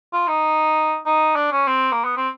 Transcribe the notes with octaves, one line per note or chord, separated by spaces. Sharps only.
F4
D#4
D#4
D4
C#4
C4
A#3
B3
C4